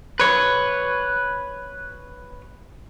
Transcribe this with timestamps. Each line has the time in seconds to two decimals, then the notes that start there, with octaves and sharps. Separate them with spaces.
0.20 B4 C#5